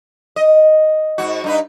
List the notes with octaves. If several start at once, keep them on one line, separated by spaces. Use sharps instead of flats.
D#5
G#2 F#4
G2 D#4 B4